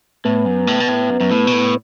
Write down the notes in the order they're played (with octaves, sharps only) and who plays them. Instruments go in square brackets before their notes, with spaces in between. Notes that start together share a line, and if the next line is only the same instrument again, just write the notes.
[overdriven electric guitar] A2 [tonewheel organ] B3
[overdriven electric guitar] F#2
A2
B2
A2
F#2
F#2
A2
B2
A2